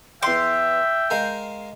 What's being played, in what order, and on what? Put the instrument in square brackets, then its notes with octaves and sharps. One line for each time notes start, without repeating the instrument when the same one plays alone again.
[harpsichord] E2 D6 [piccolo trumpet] E5 [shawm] G5 [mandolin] C6
[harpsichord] G#3 A#4 F5